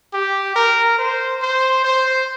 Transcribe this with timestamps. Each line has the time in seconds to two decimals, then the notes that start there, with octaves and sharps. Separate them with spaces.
0.13 G4
0.56 A#4
0.98 C5
1.42 C5
1.84 C5